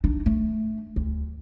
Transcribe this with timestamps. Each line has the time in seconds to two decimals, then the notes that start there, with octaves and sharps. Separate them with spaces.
0.04 D4 D#4
0.26 A3
0.96 D2